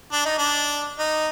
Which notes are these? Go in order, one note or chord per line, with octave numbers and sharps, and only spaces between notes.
D4
D#4
D4
D#4